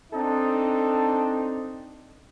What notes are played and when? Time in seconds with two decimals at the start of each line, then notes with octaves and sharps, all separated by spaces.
0.12 C4 D4 D#4 A4